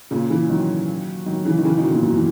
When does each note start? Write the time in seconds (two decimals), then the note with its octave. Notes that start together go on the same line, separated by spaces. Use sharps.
0.11 A#2 C#3
0.30 C#3 E3
0.49 D#3 F#3
1.26 D#3 F#3
1.45 C#3 E3
1.58 D#3
1.64 C#3 E3
1.77 B2 D#3
1.90 A#2 C#3
2.03 F#2 A#2
2.14 E3